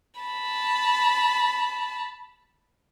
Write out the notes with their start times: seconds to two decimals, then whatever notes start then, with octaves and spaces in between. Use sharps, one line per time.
0.21 A5 B5